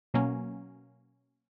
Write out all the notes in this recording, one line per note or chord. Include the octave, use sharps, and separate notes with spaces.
B2 F#3 A#3 C#4